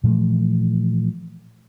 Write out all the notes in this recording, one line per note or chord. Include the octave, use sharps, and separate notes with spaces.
A#2 E3 F3 A3